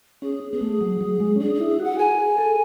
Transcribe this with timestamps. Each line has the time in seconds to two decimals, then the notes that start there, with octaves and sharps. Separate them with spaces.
0.22 C#4 G#4
0.52 B3 G#4
0.61 A3
0.81 F#3
1.01 F#3
1.20 G#3
1.36 C#4
1.40 D4 G#4
1.55 G#4
1.60 E4
1.69 G#4
1.79 F#4 F#5
1.98 G#4 G#5
2.19 G#4
2.38 A4